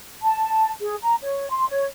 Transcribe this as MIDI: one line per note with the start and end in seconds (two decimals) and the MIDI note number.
0.22 0.70 81
0.81 0.95 68
1.02 1.16 82
1.22 1.49 73
1.50 1.68 84
1.69 1.84 73